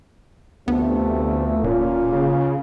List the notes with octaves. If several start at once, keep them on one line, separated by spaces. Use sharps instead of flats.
D2 C3 E3 F3 A3 B3
D1 A#2 A#3 C#4 F4
C#3